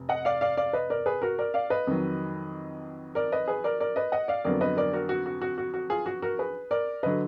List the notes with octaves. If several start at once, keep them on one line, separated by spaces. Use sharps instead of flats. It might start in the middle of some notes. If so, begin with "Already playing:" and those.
Already playing: F1
D#5 F#5
D5 F5
D5 F5
D5 F5
B4 D#5
A#4 D5
G#4 B4
F#4 A#4
A#4 D5
D5 F5
B4 D#5
F2 D#3 F#3
A#4 D5
B4 D#5
G#4 B4
A#4 D5
A#4 D5
B4 D#5
D#5 F#5
D5 F5
F2 D3 F#3 B3 A#4 D5
B4 D#5
A#4 D5
F#4 A#4
F#4
F#4
F#4
F#4
F#4
F4 G#4
F#4
F#4 A#4
G#4 B4
A#4 D5
D3 F#3 B4 D#5